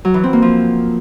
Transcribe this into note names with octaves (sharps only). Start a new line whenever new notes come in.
F#3
E3
C4
A#3
F3